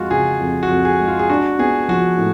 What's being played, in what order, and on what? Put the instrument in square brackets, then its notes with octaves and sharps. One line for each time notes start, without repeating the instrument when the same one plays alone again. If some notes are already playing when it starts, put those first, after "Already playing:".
Already playing: [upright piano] F2 G#3 [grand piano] F4 F#4
[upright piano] C#3 [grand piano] G#4
[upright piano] F2
[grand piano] F#4
[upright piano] F2
[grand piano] G#4
[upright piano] G#3
[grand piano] F4
G#4
[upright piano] D4 [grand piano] F#4
[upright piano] B3 [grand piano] G#4
[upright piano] F3 [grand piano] F#4
[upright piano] A2